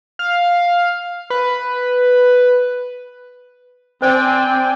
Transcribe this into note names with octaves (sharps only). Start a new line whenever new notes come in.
F5
B4
C4 C5 D5 G5 G#5